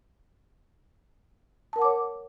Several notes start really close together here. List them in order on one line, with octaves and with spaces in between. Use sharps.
A5 A#4 F#5 D6 C#5